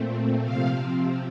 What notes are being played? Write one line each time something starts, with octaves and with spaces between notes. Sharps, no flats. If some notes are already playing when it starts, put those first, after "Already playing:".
Already playing: A#2 A3 C4
C3 F3 C4 F5